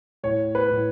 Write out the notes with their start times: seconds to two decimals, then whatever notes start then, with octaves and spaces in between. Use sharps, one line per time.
0.23 A2 C#5
0.55 B4
0.70 A2